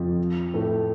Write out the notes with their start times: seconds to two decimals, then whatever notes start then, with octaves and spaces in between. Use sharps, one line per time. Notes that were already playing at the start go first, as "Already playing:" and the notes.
Already playing: F2 F3
0.54 A2 A3